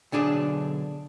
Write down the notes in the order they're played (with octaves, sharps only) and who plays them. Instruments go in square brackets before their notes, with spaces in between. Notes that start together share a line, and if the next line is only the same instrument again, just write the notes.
[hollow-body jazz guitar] B1 D3 D4 G#4